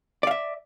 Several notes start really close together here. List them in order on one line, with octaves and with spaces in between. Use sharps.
D5 F5 E5